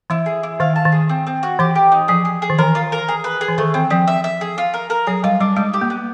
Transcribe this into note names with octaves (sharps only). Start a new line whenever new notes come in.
E3 E4
G#4
E4
D#3 F5
A5
D#3
G#4
C4
C4
F#4
E3 G4
G4
D#4
F3 G#4
G#4
G#4
D#3
E3 A#4
F4
A#4
G#4
B4
G#4
E3
D#3 A3
E3 C4
F3 C4
E5
E5
G#4
F4
A#4
A#4
F#3 G#4
G3 F4
G3 D4
G#3 D#4
G4
A#3
B3